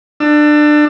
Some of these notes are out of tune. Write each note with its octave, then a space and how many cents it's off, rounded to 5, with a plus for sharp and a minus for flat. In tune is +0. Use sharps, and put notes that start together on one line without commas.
D4 +25 E6 +20